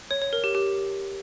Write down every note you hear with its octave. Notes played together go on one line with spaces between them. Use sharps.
C#5
C#5
A#4
G4
G4